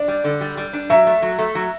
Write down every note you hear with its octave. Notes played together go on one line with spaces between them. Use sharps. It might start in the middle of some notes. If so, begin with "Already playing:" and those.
Already playing: D4 D5
G3
D3
G3
G3
D4
F#3 E5
A3
F#3
A3
F#3